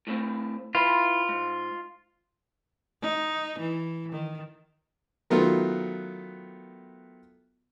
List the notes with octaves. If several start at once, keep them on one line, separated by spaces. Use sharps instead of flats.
A2 A3 C4
E4 F4 B4
G#2
D#4
E3
D#3
D#3 F#3 A3 B3 F4